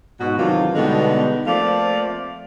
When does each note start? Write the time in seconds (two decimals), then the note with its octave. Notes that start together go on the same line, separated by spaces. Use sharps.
0.20 G#2 B2 F#4
0.38 C3 D#3 E3 F#3 D4 F4
0.75 B2 D3 G3 G#3 B3 D#4
1.46 F3 A3 A#3 C4 D5 F5